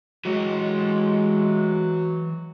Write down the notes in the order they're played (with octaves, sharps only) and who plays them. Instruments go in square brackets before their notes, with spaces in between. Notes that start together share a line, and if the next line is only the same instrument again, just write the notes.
[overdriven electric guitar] E3 C#5 [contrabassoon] F#3 [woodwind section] G#3